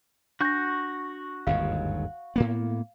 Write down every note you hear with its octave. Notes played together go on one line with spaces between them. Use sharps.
D4 F#4 C#6 G6 A#6
G1 D#2 G#2 F5
A2 A#3 B3